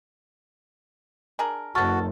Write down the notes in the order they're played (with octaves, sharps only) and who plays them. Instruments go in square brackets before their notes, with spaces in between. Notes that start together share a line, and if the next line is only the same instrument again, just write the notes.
[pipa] D4 G#4 A#4
[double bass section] F#1 [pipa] B2 A4 [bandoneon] F#4 [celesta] C#6 F6 A6